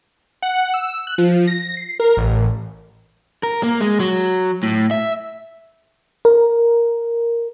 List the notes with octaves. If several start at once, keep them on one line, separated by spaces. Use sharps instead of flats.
F#5
E6
F#6
F3
A#6
C7
A#4
A1
A#4
A#3
G#3
F#3
A2
E5
A#4